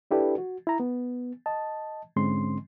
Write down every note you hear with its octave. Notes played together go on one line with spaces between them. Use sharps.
D4 E4 G4 A4 B4 D5
F#4
E4 A#5
B3
D#5 A5
G#2 D3 G#3 C4 C#4 C6